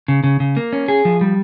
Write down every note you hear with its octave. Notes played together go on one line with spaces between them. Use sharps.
C#3
C#3
C#3
A#3
C#4
G#4
F3
G3